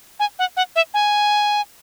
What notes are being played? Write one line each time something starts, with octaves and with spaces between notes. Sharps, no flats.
G#5
F#5
F#5
E5
G#5